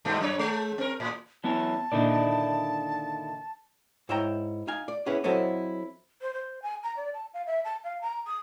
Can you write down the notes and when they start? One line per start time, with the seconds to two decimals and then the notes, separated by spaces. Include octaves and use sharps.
0.05 G2 B2 A3
0.20 F#2 C#5
0.39 G#3
0.78 C4 A#4
1.00 A2
1.44 F#3 B3 E4 A5
1.92 A#2 D3 D#3 D#4 E4 D5
4.09 G#2 E4 C#5 E5 G5 A#5
4.67 D#4 F5 G#5
4.88 D5
5.06 B3 C#4 E4 G#4 B4
5.24 F#3 C4 E4 A4 C#5 D#5
6.21 C5
6.34 C5
6.62 G#5
6.83 A#5
6.97 D5
7.14 A5
7.34 F5
7.46 E5
7.64 A5
7.84 F5
8.01 A#5
8.27 D#6